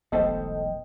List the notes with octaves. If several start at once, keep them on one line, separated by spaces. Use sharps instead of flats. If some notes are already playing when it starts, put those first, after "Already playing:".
E1 B1 A3 A4 C5 D#5 G5 A5